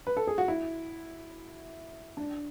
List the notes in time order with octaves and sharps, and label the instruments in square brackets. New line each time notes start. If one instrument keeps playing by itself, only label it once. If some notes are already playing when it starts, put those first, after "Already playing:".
[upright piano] B4
A4
G#4
F#4
E4
D4